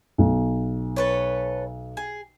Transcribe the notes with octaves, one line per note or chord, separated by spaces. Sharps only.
B1
A4 B4 C#5
G#4